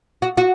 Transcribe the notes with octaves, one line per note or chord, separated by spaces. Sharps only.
F#4
F#4